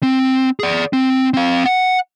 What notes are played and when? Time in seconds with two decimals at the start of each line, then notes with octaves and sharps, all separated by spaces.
0.03 C4
0.60 G#4 D5
0.93 C4
1.34 C4 F5
1.65 F#5